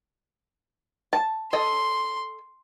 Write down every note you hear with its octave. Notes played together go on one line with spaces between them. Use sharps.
A5
A4 D#5 C6